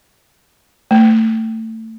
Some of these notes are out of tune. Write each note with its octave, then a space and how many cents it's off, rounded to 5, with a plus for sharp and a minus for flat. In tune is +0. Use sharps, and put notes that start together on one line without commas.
A3 +25